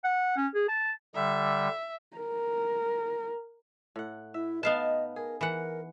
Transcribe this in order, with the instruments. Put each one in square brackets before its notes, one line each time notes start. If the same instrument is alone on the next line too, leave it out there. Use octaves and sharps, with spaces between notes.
[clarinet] F#5
C#4
G#4
A5
[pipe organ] D3 G3 [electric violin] E5
[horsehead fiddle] A#4
[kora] A2 F#5
[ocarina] E4 [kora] E5
[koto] B3 F5 A5 [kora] D#4 B4 [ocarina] D#5
[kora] G#4 [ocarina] A#4
[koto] E3 F#5 [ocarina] A#4